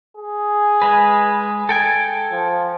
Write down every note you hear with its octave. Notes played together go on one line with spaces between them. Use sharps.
G#4
G#3 B4
A4 G5 G#5
F3